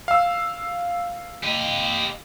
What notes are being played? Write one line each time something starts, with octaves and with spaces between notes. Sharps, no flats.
F5 E6
G4 D#5